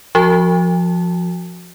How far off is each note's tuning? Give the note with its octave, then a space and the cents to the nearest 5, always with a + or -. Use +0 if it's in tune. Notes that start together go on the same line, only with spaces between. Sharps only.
F3 +0 F#4 +5 A5 +0